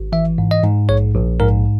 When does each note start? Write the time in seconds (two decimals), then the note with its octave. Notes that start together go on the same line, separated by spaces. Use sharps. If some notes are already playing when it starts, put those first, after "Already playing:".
Already playing: G#1
0.12 E3 E5
0.38 G#2
0.51 D#5
0.63 G#2
0.89 A#1 C#5
1.14 A#1
1.40 G#2 A#4